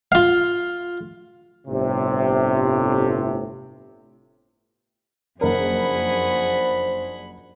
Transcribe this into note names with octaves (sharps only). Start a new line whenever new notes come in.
F4 F5
G1 A2 C3
F#1 F2 D4 G#4 A#4 C5 F#5 B5